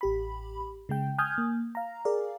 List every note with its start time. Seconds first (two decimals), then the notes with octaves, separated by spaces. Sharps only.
0.01 A1 G4 B5
0.89 C#3 G#3 G5
1.18 G#5 D#6 F6 G6 G#6
1.38 A#3
1.75 F5 A#5
2.05 G#4 A#4 D5 F5